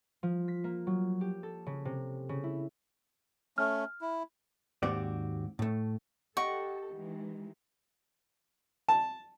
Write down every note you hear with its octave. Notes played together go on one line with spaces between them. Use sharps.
F3
B6
A#3
F#3
G4
A4
C#3
C3
C#3
E4
A3 C#4 F6
E4
D#2 G#2 C4 F#4 G4 D5
A2 A3
G4 A4 D#5 F#5 G5 C#6
D#3 E3 G#3
A5